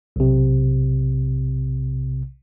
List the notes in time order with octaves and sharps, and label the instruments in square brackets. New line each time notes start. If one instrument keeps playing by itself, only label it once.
[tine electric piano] B1 C3